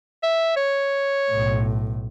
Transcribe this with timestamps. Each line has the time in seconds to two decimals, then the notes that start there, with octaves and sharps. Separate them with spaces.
0.23 E5
0.56 C#5
1.31 B1 A2